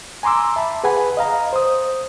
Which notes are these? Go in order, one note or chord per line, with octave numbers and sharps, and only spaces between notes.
G#5 A#5 C6 D6 E6
E5 A5 B5
G#4 B4 F#5 G#5 B5
D#5 F5 A#5
C5 D#6